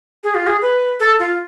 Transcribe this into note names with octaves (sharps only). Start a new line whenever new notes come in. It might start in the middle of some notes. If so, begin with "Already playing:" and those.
G#4
F4
G#4
B4
A4
F4